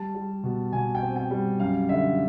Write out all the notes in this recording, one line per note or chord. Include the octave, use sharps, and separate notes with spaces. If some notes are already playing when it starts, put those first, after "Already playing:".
Already playing: G3 A5
G3
B2
B2 G#5
G5
C4
G5
G3
F#2 F5
D3 E5